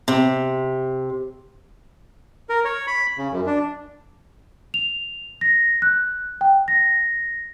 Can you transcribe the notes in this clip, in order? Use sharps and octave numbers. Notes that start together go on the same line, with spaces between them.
C3
A#4
C#5
B5
C#3
F#2
D4
F7
A#6
F#6
G5
A#6